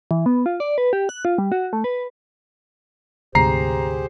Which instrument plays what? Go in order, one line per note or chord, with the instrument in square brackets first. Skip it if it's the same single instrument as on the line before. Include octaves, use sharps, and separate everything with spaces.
[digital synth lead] E3
B3
F4
D5
B4
G4
F#6
F4
G3
F#4
A3
B4
[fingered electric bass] D2 G#2 C3 [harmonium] G4 G#4 C5 [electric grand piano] A#5 C7